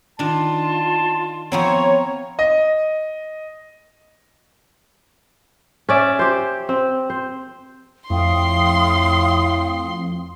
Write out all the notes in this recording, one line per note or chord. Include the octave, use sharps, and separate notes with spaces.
D#3 D4 F4 A5
F3 B3 C4 C#5 A#5
D#5
C#4 D5 E5
G4 C5
C4
C5
F2 A2 F5 G5 C6 D#6